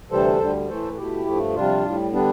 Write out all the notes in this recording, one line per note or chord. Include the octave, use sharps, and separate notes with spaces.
D2 C3 E3 G3 A4 C5
D2 D3 G3
A2 E3 A3 A4 C5
B2 A3 E4 G4
G2 F3 A3
F2 C3 G3 D4 F4
A2 G3
D3 G3 B3 D4